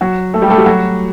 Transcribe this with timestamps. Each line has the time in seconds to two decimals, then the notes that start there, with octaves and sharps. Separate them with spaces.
0.01 F#3 F#4
0.34 A3 A4
0.42 G3 G4
0.50 A3 A4
0.58 G3 G4
0.66 F#3 F#4